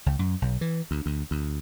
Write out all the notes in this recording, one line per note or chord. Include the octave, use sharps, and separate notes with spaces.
C#2
F#2
B1
E3
D2
D2
D2